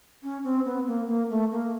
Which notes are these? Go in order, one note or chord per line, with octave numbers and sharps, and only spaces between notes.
C#4
C4
B3
A#3
A#3
A3
A#3